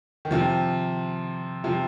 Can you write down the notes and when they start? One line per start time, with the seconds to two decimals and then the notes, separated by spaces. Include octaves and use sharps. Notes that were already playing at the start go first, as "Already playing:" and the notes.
0.25 D#3
0.31 C3 F3
1.64 C3 F3